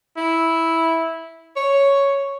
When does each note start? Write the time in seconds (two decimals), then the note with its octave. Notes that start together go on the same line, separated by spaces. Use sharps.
0.17 E4
1.56 C#5